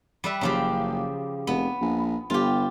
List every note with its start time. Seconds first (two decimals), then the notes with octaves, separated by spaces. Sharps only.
0.24 G3 B4 E5
0.41 F#1 C#3 F3 G4
1.47 F1 B3
1.80 A#1
2.30 G1 F4 G4